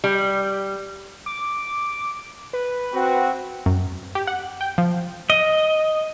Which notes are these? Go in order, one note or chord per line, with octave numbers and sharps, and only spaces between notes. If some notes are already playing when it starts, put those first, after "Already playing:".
G3
D6
B4
C4 F#4
F#2
G4
F#5
G5
F3
D#5